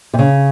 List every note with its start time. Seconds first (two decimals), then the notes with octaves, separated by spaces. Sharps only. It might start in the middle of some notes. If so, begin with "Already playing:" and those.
0.14 C3
0.19 C#3